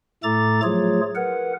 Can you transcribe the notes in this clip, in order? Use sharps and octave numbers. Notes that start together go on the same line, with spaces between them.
A2 A3 A4 A#5 D6 A6
F3 F#3 A3 F4 G#4 C#5
A#4 B4 F#5